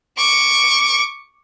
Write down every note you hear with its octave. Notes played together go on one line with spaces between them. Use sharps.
C#6 D6